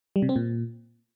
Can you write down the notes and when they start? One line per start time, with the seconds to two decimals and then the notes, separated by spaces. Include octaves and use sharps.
0.16 G3
0.22 C3
0.29 C4
0.36 A#2